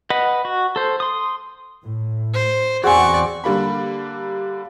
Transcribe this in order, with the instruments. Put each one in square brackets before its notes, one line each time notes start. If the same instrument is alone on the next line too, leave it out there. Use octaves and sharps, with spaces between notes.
[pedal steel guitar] B4 D#5 F#5
F#4
A4 C5
C6 D#6
[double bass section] A2
[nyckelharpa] C5
[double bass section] E2 [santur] C4 F#4 [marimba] G#4 G#5 [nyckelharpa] D5 C#6
[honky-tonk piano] D3 G3 A#3 B5